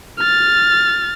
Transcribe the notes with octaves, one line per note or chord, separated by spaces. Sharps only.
F6 A6